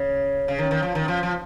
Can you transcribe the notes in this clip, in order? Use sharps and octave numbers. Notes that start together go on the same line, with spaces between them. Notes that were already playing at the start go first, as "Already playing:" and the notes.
Already playing: C#3
C#3
D#3
D#3
F3
D#3
F3
F3